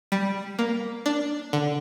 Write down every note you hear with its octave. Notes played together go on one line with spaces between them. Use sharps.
G3
A#3
D4
D3